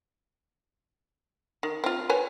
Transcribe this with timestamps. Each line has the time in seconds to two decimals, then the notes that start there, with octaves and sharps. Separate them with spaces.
1.63 D#3
1.84 C4 F4
2.10 B4 C#5 G#5